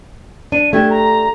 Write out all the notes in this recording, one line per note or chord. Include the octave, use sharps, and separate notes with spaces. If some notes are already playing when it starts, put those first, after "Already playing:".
D4 D#7
A3 D4 G4 G#6
A#5